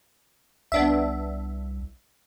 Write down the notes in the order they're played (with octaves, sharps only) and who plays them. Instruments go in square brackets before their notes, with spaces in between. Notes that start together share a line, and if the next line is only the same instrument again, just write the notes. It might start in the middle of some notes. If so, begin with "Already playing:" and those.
[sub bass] C2 [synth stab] B3 D4 E5